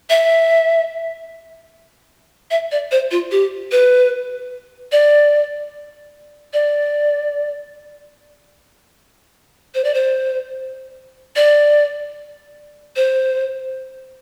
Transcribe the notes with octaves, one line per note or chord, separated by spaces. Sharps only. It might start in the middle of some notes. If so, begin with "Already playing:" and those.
E5
E5
D5
C5
F4
G4
B4
D5
D5
C5
D5
C5
D5
C5